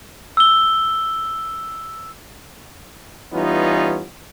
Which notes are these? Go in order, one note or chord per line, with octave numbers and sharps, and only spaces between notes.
E6 G7
E3 G3 B3 C#4 D#4 F4